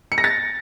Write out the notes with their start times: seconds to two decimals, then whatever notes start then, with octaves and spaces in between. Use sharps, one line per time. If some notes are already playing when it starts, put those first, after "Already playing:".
0.12 C#7
0.18 A#6
0.24 A6